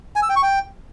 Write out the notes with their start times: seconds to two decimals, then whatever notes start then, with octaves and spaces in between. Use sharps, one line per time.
0.16 G#5
0.23 E6
0.29 G5
0.36 C#6
0.43 G5